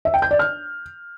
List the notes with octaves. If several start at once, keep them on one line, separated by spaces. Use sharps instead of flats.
E5
G5
G6
D5
F6